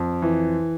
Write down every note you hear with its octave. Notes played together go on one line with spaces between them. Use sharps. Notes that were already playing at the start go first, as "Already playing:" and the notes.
Already playing: F2
E3